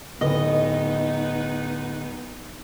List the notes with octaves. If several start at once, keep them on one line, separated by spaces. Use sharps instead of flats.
D1 B3 D#4 B4 D#5